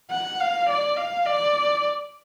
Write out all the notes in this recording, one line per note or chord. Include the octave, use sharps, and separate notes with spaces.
F#5
F5
D5
F5
D5